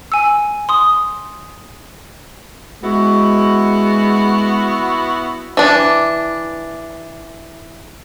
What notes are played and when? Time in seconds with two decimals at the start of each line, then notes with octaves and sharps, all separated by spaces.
0.12 G#5 E6
0.69 C6 D#6
2.82 G#3 B3 E4 F#4
5.57 E3 D4